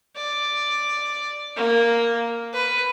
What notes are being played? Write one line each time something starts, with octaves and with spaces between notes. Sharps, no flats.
D5
A#3
B4